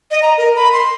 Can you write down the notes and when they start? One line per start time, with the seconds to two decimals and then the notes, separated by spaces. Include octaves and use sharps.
0.11 D#5
0.22 A#5
0.38 A#4
0.56 B5
0.73 C6